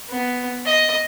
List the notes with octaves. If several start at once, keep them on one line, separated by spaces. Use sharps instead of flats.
B3
D#5